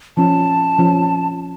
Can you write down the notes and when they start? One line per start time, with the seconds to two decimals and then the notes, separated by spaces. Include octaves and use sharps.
0.17 F3 C#4 F4 A5
0.79 F3 C#4 F4